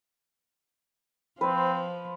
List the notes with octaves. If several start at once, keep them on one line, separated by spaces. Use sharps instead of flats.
F3 C4 B4 C6